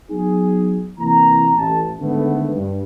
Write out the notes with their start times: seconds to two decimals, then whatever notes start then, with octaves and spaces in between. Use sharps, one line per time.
0.10 F#3 B3 D#4 G#4
0.99 C3 E3 A#3 A#5
1.56 A1 A5
2.00 G#2 D3 D#3 A3 B3
2.54 G2